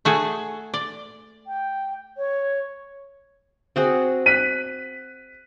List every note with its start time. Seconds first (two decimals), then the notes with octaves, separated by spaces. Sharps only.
0.05 A3 F#4 G#4
0.74 D5
1.47 G5
2.18 C#5
3.76 C4 F#4 G#4
4.26 F#6 B6 D#7